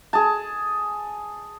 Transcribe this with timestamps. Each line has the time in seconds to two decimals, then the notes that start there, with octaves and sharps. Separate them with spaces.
0.13 G#4 A5